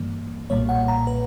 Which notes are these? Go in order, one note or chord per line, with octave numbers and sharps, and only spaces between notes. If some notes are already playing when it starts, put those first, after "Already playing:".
Already playing: G2 E3 G3 A#3
B1 A#2 G3 A#3 C#5
F#5
A#5
B4